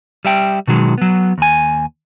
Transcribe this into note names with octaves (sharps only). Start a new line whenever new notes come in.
G3 E5 G5
B2 D#3 F#3 G#3
F#3 B3
D#2 G#5